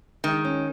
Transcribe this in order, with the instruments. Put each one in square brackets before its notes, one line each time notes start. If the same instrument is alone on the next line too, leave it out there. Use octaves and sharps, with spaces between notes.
[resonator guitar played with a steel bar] D#3 [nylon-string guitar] G#3
[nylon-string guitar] C#4